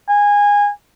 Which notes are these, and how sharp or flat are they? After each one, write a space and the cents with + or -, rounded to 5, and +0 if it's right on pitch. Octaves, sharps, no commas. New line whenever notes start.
G#5 -20